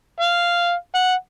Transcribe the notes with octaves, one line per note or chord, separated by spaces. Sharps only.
F5
F#5